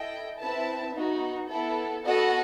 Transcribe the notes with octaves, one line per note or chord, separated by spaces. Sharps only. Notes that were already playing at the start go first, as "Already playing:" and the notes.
Already playing: E4 A4 D#5 G5
C4 E4 B4 E5 A5
B3 D#4 F#4
B3 E4 A4
B3 F#4 A4 D#5 F#5